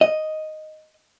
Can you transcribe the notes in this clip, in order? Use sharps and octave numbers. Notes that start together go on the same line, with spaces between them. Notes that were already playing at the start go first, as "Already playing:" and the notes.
D#5